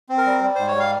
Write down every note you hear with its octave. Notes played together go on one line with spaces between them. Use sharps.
C4
A#4
G3
G3
G#2 C5
C#5
G3 F5